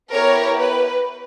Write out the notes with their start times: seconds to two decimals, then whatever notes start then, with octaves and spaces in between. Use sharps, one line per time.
0.11 B3 E4 G4 A#4 C#5
0.58 B4